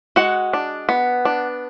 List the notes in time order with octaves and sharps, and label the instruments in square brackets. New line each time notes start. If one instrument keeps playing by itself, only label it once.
[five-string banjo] G#3 F#4 F#5
D4
B3
D4